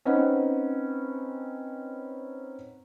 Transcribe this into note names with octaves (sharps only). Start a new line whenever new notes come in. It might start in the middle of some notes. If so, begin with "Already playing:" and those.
C4 C#4 D#4 B4 F#5